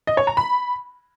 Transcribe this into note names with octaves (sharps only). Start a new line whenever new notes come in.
D#5
C#5
A#5
B5